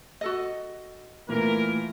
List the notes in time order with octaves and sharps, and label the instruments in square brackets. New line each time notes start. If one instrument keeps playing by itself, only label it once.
[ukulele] F#4 A4 D#5
[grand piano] A#2 E3 [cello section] A3 [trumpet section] A#4